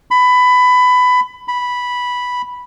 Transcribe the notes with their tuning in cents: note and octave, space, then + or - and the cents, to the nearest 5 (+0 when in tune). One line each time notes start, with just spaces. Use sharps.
B5 +20
B5 -5